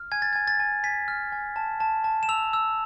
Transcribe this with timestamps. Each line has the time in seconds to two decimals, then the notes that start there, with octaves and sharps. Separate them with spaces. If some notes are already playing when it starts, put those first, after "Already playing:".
Already playing: F6
0.12 G#5 G#6
0.22 A6
0.33 G#5 G#6
0.48 A6
0.60 G#5
0.84 G#5 B6
1.08 F6
1.32 G#5
1.56 A5
1.80 A5
2.04 A5
2.23 E7
2.29 E6 F7
2.53 E6